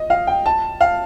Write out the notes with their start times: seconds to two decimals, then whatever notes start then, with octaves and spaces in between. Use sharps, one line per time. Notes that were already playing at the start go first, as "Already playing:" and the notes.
Already playing: D#5
0.10 F5
0.27 G5
0.46 A5
0.81 F5